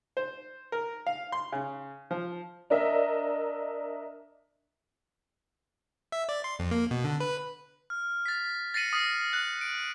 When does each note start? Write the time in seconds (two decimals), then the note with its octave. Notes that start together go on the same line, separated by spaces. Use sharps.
0.17 C5
0.72 A#4
1.07 F5
1.32 C6
1.52 C#3
2.11 F3
2.70 D4 A#4 D#5 E5
6.12 E5
6.29 D5
6.44 C6
6.59 F2
6.71 A#3
6.91 B2
7.04 D3
7.20 B4
7.90 F6
8.26 A6 B6
8.74 A6 A#6 C7 C#7 D#7 F#7
8.93 D#6 F6 A#6 C7
9.33 F#6
9.61 D7